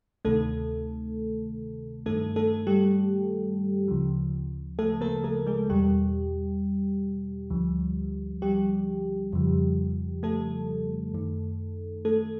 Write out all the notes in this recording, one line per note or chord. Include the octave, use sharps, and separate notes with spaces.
D2 C3 D#3 A3 A4
G2 D#3 A3 A4
A3 A4
G3 G4
D2 C#3 F3
A3 A4
A#3 A#4
A3 A4
G#3 G#4
E2 B2 G3 G4
D2 D3 F3
G3 G4
F2 C#3 F3
A3 A4
F#2 D#3
A3 A4